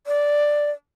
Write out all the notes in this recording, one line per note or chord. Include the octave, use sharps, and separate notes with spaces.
D5